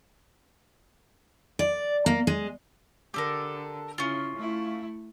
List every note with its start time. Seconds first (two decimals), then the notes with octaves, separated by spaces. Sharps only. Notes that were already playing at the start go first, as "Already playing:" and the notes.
1.59 D5
2.06 A#3
2.27 G#3
3.14 D3 G4 A4 A#4
3.98 C#3 C#4 E4 F4
4.36 A3 E4